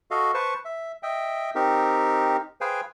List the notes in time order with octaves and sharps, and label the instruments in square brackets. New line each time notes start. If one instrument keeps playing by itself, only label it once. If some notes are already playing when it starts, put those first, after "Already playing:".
[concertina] F#4 A4 D#5 F5
B4 C5 A5 C#6
E5
D#5 E5 G5
C4 D#4 G4 A#4
G#4 B4 C5 F5 G5 G#5